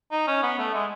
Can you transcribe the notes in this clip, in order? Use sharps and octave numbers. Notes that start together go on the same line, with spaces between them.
D#4
C#4
B3
A3
G#3